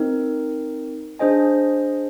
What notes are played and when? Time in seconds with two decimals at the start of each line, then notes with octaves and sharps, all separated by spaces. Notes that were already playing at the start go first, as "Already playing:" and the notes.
Already playing: C4 D#4 A#4
1.19 D4 G#4 C5 D#5 G#5